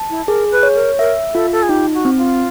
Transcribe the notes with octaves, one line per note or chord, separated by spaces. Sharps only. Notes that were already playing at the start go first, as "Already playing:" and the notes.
Already playing: A5
E4
G#4 A#4
B4
C#5
A#4
A#4 E5
F4 A4
A4
G#4
D#4 G4
F#4
C4
F4